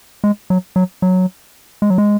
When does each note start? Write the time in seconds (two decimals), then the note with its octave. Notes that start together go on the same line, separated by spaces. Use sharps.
0.24 G#3
0.50 F#3
0.76 F#3
1.02 F#3
1.82 G#3
1.90 F#3
1.98 G#3